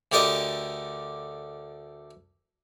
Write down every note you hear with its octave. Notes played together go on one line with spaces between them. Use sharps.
D2 D3 G4 A#4 D5 D#5